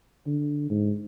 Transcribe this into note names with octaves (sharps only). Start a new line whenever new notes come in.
D3
G#2